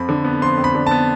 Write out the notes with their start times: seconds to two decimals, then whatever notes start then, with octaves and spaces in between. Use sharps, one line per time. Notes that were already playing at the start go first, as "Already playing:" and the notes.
Already playing: F2 F3 B5
0.09 D3
0.24 B3
0.42 F3 C6
0.58 F2
0.64 B5
0.75 D3
0.87 B3 A5